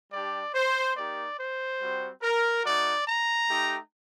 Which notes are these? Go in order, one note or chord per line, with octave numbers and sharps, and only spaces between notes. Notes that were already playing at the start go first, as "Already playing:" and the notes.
G3 D4 G4 D5
C5
A#3 D#4 G4 D5
C5
G3 C4 F#4
A#4
A3 D#4 F#4 D5
A#5
A3 D#4 G4